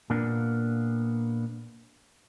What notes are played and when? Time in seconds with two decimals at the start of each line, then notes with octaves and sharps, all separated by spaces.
0.10 A#2 A#3 B3 D4